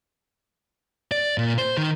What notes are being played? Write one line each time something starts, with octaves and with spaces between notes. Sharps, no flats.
D5
A#2
C5
D#3